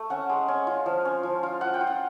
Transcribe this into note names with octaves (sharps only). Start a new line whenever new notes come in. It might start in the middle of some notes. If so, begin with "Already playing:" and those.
Already playing: A3
C#4 F#5
G#3
C#4
F4
F3
C#4
F3
F4
F4 F#5
G5
F4
F#5